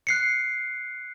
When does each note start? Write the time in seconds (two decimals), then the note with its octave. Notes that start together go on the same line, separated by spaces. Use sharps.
0.07 F#6 C7 C#7